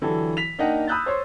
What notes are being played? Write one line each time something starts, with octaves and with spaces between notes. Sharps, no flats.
D3 E3 F#3 G4 A4
B6 F7
A#3 D4 D#4 D#5 F#5 G5
B5 D#6 E6 F#6 G6 A6
C5 C#5 C6